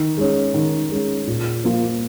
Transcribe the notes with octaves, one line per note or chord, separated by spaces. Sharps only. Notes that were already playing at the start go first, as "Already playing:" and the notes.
Already playing: D#3
G#3 C#4
D#3
G#3 C#4
A#2
F3 A#3 F4